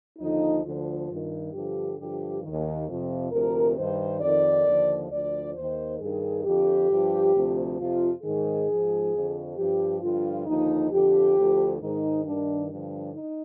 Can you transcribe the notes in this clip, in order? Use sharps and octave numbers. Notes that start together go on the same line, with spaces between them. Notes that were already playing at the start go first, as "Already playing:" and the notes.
D#2 D3 F3 D#4
D2 D3 F3 F4
G2 D#3
G2 D3 F3 G4
G2 D3 F3 G4
D#2 D#3
F2 C3 F3
D2 C3 F3 A#4
G2 D#3 C5
F2 D#3 D5
D#2 D3 F3
D2 D3 F3 D5
D#2 D#3 C5
G2 D#3 G#4
F2 D3 F3 G4
G2 F3
D2 C3 F3
F2 C3 F3 F4
G#2 D#3 G#4
G#2 F3
F2 D3 F3
G2 F3 G4
G2 D3 F3 F4
D#2 D3 F3 D#4
F2 D3 F3 G4
D2 D3 F3
G#2 D#3 D#4
G2 D#3 D4
G2 D3 F3 D4
D#4